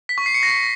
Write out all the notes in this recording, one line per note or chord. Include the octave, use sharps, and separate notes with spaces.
B6
C#6
C7
C#7
A#6